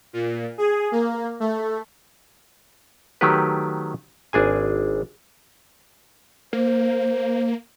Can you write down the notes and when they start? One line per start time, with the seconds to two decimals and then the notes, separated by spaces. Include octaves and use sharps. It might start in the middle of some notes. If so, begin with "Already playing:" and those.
0.13 A#2
0.58 G#4
0.92 A#3
1.40 A3
3.21 D#3 F#3 A3 G4 B4
4.33 G#1 D4 G#4 G#5
6.53 A#3 C5